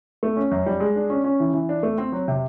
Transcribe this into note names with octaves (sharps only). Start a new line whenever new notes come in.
A3
C#4
F#2
G3
G#3
D4
C#4
C#4
E3
E3
D4
A3
C4
F#3
C3